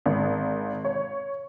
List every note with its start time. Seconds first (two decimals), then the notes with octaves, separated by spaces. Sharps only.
0.06 G#1
0.85 C#5